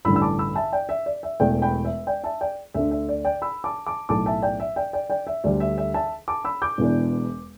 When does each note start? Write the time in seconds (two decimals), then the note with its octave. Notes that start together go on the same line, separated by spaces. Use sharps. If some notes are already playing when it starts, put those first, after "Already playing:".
0.05 A1 G2 D3 B5 E6
0.16 E6
0.22 A5 D6
0.39 B5 E6
0.56 E5 A5
0.72 D5 G5
0.89 E5
1.06 D5
1.23 E5
1.40 E1 E2 E3 A3 D5 G5
1.62 G5 B5
1.85 E5
2.07 D5 G5
2.24 E5 A5
2.41 D5 G5
2.74 D2 D3 A3 D4 E5
2.91 E5
3.09 D5
3.25 D5 G5
3.42 B5 E6
3.64 A5 D6
3.86 A5 D6
4.09 B1 A2 A3 A5 D6
4.26 E5 A5
4.42 D5 G5
4.60 E5
4.76 D5 G5
4.93 D5 G5
5.10 D5 G5
5.27 E5
5.44 D2 D3 G3 D5
5.60 E5
5.78 E5
5.94 E5 A5
6.28 A5 D6
6.45 B5 E6
6.62 D6 G6
6.78 E1 E2 E3 B3 D4